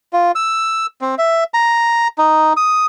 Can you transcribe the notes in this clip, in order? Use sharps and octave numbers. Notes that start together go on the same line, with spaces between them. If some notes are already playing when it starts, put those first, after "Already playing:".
F4
E6
C4
E5
A#5
D#4
D#6